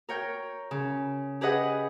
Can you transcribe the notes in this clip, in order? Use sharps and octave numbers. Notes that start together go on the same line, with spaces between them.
A#4 C#5 G5
C#3
G4 G#4 B4 D#5 F#5